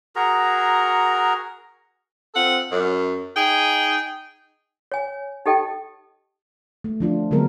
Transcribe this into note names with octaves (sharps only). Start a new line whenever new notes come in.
F#4 G#4 A#4 A#5
C4 F4 A4 F#5
F#2
D#4 G#4 G5
C#5 G#5
D#4 G4 A4 D#5 G5 A5
A3
F3 D4 F4
D3 F#3 G#3 A#3 B3 A#4